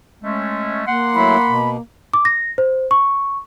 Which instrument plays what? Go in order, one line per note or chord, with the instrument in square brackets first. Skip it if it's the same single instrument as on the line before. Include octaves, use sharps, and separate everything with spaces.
[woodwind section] G#3 A3 C#4
[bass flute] A#3 [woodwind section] F#5 C6
[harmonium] F#3 A3 E4 [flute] B5
[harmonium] B2
[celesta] D6
A#6
C5
C#6